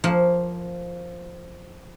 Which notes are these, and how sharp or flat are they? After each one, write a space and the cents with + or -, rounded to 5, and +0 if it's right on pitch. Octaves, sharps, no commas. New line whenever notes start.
F3 +0 A#3 +0